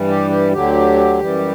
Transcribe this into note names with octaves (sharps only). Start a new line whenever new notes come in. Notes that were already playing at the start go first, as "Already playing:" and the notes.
Already playing: G2 E3 G3
G4
G4
D2 D3 F#3 G4
F#2 E3 G3